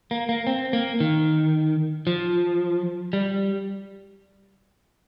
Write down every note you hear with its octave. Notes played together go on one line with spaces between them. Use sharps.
A#3
A#3
C4
A#3
D#3
F3
G3